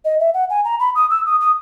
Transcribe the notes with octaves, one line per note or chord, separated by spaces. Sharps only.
D#5
E5
F#5
G#5
A#5
B5
D#6
E6
D#6
D#6